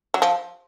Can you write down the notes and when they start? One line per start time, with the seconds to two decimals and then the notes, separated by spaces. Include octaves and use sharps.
0.14 F#3
0.22 F3